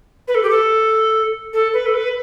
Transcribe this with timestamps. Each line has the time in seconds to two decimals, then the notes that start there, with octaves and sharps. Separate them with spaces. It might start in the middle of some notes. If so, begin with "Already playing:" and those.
0.28 B4
0.35 A4
0.43 G4
0.50 A4
1.53 A4
1.73 B4
1.86 A4
1.94 B4